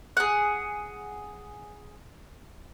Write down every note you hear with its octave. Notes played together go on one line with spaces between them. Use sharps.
G#4 F#5